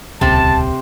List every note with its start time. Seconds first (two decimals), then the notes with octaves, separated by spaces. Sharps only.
0.21 D#1 C#2 C3 C4 A5